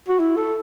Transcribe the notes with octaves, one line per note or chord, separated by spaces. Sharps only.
F#4
E4
A4